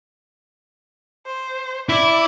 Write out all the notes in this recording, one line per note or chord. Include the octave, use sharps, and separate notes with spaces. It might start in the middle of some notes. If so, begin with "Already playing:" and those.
C5
E4 D5